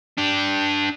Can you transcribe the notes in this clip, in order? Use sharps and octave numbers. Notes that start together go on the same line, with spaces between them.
D4 G4